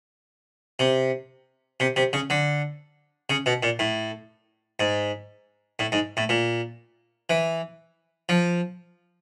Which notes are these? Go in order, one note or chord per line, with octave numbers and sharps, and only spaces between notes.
C3
C3
C3
C#3
D3
C#3
B2
A#2
A2
G#2
A2
G#2
A2
A#2
E3
F3